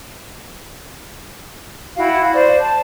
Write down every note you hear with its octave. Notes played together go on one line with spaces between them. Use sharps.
E4 F#4 F5 G5
F5
C5 D5
A5